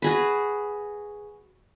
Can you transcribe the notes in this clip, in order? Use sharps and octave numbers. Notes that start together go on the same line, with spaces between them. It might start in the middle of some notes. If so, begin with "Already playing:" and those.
F#4 G#4 B4